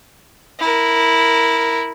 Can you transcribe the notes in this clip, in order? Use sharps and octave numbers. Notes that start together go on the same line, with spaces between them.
E4 A#4